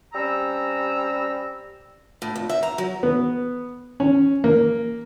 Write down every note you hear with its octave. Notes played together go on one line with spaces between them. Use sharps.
G3 C4 C#4 A#5 E6
A2
F2
E5
A#5
F#3
B3
C#4
A#3